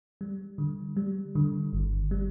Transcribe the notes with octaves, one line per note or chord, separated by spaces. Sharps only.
G3
D3
G3
D3
G1
G3